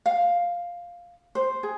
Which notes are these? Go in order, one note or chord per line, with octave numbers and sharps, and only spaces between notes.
F5
C5
G#4